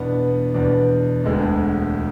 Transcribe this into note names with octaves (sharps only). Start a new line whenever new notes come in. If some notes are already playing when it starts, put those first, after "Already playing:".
Already playing: E2 B2 B3 D4
E2 B2 B3 D4
E1 D2 D3 G#3 D4